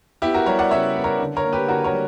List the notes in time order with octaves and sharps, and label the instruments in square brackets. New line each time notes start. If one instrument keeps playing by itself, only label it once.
[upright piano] B3 E4 G4
F#4 A#4
G3 A#4 C#5
D5 F#5
C#3 C#5 E5
B3
A#4 C#5
D3
A#4 C#5
A#3
G4 B4
D3 F#4 A#4
A#4 C#5
G3